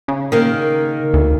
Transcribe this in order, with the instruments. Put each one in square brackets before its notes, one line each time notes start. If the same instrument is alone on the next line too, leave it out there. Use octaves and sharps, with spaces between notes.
[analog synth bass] C#3
[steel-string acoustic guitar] D#3 A#3
[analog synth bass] D2